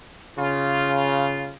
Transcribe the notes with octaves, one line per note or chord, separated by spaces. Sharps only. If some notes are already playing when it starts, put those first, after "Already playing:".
C#3 F4